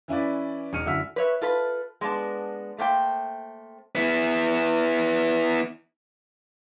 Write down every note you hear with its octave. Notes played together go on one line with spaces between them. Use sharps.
E3 C#4 E4 B4 D5
E1 D#4 F6 C#7 D#7
F#2 D3 E4 E6 F6 B6
B4 C#5 E5
F4 A4 B4
G#3 B3 D4 C#5 A5
A3 A#3 C4 G5
B3 E4